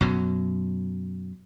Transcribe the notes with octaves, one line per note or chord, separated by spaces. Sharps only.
F#2 B2 F#3